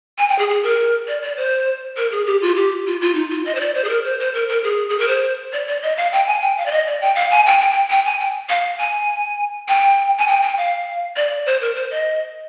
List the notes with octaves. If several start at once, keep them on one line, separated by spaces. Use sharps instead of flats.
G#5
G5
G#4
G#4
A#4
D5
D5
C5
A#4
G#4
G4
F4
G4
F4
F4
D#4
F4
D#5
C5
D5
C5
G#4
A#4
C5
C5
A#4
A#4
G#4
G#4
A#4
C5
D5
D5
D#5
F5
G5
G#5
G5
F5
D5
D#5
D5
G5
F5
G#5
G5
G5
G5
G5
G#5
G5
F5
G#5
G5
G#5
G5
G5
F5
D5
C5
A#4
C5
D#5